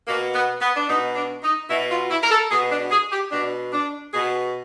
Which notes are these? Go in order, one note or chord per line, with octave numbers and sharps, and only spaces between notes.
B2 A#3
B3
B3
D4
B2 D#4
D4
D#4
B2 E4
F4
E4
A#4
A4
B2 G#4
D4
G#4
G4
B2 D4
D4
B2 G#4